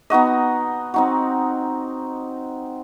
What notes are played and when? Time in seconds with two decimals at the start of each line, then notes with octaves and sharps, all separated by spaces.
0.10 B3 D#4 F#4 D#5
0.94 C4 D#4 F#4